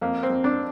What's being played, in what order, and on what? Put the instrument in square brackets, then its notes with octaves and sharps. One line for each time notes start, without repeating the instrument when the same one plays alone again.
[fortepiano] F2 A#3
C4
F2
D4